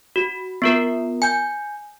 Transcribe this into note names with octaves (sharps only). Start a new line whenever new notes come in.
F#4
B3 F4 A#4
G#5 G6